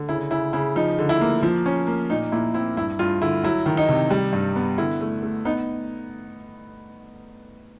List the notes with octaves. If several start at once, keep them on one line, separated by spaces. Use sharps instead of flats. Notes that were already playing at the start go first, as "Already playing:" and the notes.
Already playing: D3
C#3 E4
C#3 E4
C#3 E4
F3 D#4
D3
E4
A#3
F3
C#4
A#3
A#2 D#4
A#2 E4
C4 E4
G2 E4
G2 F4
D3 E4
F#3 E4
D#3
D#4
C3
G3
G2
B3
D3 E4
A3
A3
B3 D#4